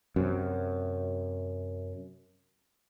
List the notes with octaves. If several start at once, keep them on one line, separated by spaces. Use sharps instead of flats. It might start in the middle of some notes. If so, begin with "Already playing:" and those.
F#2 C3